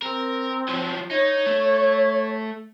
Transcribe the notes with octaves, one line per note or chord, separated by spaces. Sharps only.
C4 A#4
F3 F#3
D#4 C#5
A3